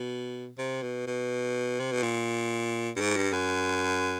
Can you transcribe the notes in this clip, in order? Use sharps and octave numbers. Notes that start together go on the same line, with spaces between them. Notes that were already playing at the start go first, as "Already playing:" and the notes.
Already playing: B2
C3
B2
B2
C3
B2
A#2
G2
G#2
G2
F#2